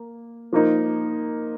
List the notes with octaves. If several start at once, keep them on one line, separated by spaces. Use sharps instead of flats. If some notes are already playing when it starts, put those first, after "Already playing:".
Already playing: A#3
F3 A#3 D#4